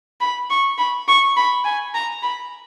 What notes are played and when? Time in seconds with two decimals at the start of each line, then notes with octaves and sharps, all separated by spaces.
0.21 B5
0.50 C#6
0.78 B5
1.08 C#6
1.36 B5
1.64 G#5
1.94 A#5
2.23 B5